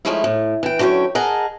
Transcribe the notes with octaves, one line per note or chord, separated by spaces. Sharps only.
F3 G#3 A3 C#4 D#4 E4
A2
E3 G5
D3 F#3 C#4 C#5 G5
G#4 A#4 D#5 F#5 G#5 A5